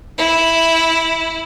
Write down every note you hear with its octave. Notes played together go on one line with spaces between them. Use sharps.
E4